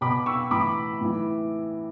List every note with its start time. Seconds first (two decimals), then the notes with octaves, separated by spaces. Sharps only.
0.01 B2 B5 D6
0.26 C#6 E6
0.51 A2 E3 B5 D6
1.01 A2 E3